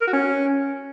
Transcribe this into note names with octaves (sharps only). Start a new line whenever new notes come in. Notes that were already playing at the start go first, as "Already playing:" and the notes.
A#4
F#4
C#4